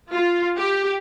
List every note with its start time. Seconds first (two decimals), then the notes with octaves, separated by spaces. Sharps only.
0.12 F4
0.58 G4